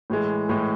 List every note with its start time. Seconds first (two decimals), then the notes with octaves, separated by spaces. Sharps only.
0.10 A2 E3 G#3
0.49 A2 E3 G#3